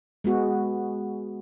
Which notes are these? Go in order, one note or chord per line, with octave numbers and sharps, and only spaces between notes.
G#3 B3 F#4 G#4